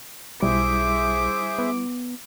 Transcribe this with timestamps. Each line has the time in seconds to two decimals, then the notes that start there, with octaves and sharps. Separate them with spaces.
0.42 B1 G3 E4 G#4 C5 E5 D6
1.59 B3